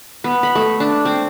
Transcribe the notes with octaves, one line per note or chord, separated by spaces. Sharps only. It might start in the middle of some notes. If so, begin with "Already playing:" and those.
B3
B5
A3
D4
C4